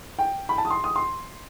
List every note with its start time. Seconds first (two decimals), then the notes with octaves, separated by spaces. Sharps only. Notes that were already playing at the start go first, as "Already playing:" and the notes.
0.19 G5
0.49 B5
0.58 A5
0.65 D#6
0.70 C6
0.84 D#6
0.96 C6